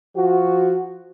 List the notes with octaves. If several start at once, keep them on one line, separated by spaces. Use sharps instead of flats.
F3 F#4